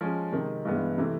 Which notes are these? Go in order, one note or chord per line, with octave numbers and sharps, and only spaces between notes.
F3 G#3 C#4
C3 D#3 G#3
G2 E3 G#3 B3
C3 E3 A3